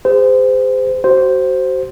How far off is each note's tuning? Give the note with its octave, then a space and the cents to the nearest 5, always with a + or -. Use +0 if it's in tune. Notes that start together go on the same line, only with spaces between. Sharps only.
G#4 -40 C5 -30
F#4 +35 C5 +0